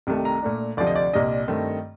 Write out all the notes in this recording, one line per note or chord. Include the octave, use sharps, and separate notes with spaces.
C2 C3 D#3 A3
A#5
A#2 A3 D4
D2 C3 F3 D5
D#5
D5
C2 A#2 G3 D4 D#5
G2 D#3 A3 C4